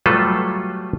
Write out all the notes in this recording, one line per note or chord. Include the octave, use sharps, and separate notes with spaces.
F#3 G3 A3 F4 A4 B4